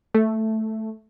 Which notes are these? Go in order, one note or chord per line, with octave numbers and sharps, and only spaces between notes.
A3